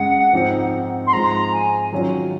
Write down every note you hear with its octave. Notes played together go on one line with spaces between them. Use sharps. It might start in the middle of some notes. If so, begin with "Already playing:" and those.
Already playing: F#2 C#3 G#3 F#5
G#2 F3 C4 D#4
C6
G#2 F3 G#3 A#5
G#5
D#3 F#3 C#4 F4